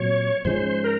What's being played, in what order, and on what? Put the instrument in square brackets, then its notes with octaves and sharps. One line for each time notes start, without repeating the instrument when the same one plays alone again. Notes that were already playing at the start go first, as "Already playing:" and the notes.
Already playing: [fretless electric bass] A#2 F#3 C4 [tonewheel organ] C#5
[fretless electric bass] G#2 F3 G#3 C#4 [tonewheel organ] C5
[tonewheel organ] A#4